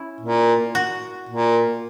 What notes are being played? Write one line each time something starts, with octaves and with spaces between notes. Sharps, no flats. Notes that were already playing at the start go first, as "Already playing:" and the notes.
Already playing: C#4 E4
A#2
F#4
A#2